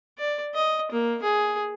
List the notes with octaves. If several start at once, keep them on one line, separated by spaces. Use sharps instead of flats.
D5
D#5
A#3
G#4